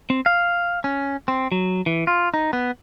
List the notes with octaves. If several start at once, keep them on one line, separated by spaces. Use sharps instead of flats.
C4
F5
C#4
C4
F#3
E3
F4
D#4
B3